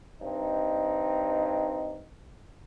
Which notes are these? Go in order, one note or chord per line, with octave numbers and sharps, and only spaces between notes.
G2 C4 D#4